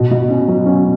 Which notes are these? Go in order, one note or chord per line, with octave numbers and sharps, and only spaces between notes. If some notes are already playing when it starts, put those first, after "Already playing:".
Already playing: B2
B2
C#4
F#3
C#4